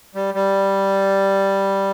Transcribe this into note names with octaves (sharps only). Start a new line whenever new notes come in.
G3
G3